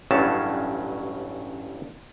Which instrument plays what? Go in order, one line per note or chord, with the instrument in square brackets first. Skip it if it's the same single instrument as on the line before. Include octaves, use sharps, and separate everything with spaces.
[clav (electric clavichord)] A1 G2 C#3 F#3 C#4 A5